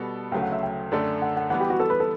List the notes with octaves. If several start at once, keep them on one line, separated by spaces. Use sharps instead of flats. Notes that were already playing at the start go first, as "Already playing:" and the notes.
Already playing: B2 G3 B3 F#4 A4
D2 C#3 F#3 A3 G5
F#5
E5
G5
F#2 D3 A3 D4 A4
F#5
F#5
E3 G3 B3 F#5
G4
F#4
A4
B4
A4